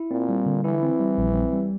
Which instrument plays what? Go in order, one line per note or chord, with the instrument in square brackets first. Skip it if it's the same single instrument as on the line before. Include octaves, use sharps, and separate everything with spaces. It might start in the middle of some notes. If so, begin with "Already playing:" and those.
Already playing: [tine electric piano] E4
[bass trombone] A#2 [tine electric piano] C4
[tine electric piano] G3
D3
[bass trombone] E3 [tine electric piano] E4
[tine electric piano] C4
G3
A#1
C4
G3